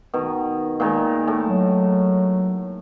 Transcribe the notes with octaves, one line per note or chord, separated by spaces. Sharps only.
B2 D#3
A#2 D#3 G#3
A2 A5
F#3